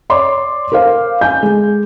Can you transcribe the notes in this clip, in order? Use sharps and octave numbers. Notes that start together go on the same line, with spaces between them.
C#5 D5 C6 D6
A#4 C5 F5
G#5 G6
G#3